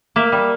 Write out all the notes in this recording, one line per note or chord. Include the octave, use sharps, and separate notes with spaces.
A#3 E5
G3